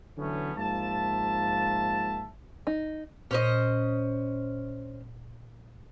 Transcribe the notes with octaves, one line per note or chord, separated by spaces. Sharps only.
D3 E3 F#3 A3 B3 C#4
G#2 F3 A#3 E5 A5
D#4
A#2 C#4 C5 D#5